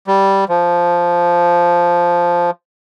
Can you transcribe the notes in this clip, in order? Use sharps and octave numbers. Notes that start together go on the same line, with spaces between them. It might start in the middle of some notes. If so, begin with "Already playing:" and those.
G3
F3